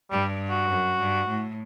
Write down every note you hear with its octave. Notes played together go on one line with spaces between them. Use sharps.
G2 G3
F#4
F#2
G2
A2